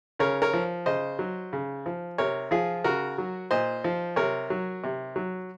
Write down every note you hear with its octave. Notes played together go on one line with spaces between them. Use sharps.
C#3 A#4 C#5
A#4 C#5
F3
C#3 C5 D#5
F#3
C#3
F3
C3 A#4 C#5
F3 F4 G#4
C#3 F#4 A#4
F#3
A#2 C5 D#5
F3
C3 A#4 C#5
F#3
C3
F#3